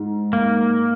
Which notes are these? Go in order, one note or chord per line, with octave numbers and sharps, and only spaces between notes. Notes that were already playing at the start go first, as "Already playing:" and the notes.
Already playing: G#2
A#3